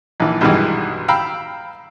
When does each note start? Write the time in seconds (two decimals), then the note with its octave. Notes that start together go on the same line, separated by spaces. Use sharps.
0.20 A#1 E3
0.41 B1 G2 B2 D#3 E3 G#3
1.08 F5 G5 A#5 B5 E6